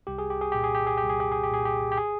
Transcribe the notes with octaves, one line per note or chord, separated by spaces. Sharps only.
C2 G4
G#4
G4
G#4
A#2 G4
G#4
G4
G#4
C2 G4
G#4
G4
G#4
G4
A#2 G#4
G4
G4
G#4